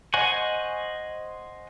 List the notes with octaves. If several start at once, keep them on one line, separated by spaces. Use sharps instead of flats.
C5 D#5 F#5 G#5 C#6